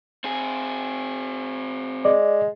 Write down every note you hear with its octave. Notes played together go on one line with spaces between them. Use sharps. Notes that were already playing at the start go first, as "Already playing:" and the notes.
C4 G#4
G#3 D5